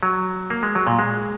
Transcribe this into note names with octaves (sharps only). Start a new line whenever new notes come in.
F#3
A#3
G#3
F#3
A#2
G#3